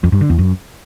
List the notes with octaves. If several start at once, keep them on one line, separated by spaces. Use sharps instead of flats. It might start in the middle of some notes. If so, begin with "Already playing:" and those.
F2
G2
D3
E2
F#2